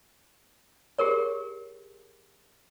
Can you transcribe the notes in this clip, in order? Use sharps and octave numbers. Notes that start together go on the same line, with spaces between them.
G4 G#4 A#4 C#5